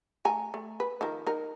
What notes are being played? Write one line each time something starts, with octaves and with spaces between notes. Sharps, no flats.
A3 G#5 A#5
A3
B4
D#3 F3 A#4
D#4 A#4